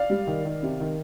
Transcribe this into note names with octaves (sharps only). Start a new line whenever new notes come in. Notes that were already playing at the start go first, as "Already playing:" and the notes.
Already playing: D5 F5
G3
D#3
D#3
C3
D#3